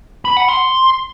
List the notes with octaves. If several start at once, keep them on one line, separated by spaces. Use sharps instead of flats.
B5
F#5
C6